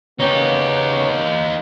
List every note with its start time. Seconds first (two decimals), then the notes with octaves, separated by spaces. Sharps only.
0.19 C#3 B3 D#4 G4 C#5